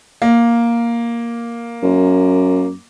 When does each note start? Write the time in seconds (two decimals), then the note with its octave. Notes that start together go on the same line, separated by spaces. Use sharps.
0.22 A#3
1.83 F#2